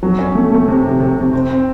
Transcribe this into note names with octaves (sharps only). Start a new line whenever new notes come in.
F#3
C#4
A3
A3
C3
C3
C3
C3
C4
C4